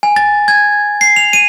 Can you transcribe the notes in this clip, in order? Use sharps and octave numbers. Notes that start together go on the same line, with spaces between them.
G#5
A6
G#6
C7
F7
D#7